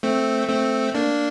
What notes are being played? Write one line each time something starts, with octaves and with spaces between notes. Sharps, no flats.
A3 C4
A3 C4
A#3 D4